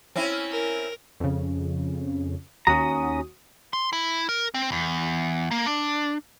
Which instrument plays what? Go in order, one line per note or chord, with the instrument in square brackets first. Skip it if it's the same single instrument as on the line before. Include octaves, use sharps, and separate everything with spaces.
[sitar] C4 C#4 E4
[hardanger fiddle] A#4
[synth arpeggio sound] F2 C#3
[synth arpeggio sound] D#2 F#4 D#6 [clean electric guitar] C#4 A#5
[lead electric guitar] C6
E4
A#4
C4
E2
A#3
D4